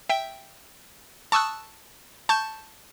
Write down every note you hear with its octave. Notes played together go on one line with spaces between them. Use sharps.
E5 G5
A5 C#6 D#6 E6 F#6
A5 C#6 G6